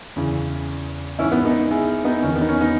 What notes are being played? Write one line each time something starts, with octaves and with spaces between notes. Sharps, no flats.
E2 C#3 E3
G#2 E3 C#4 E4
B3
B3 D#4
E4 G#4
B3 D#4
E2 D#3 C#4
B3
D#4
C#4
B3 D#4